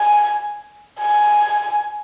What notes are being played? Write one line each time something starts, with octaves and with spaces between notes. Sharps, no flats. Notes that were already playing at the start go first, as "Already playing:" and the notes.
Already playing: G#5
G#5